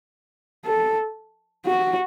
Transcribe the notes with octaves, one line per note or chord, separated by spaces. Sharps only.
A4
F#4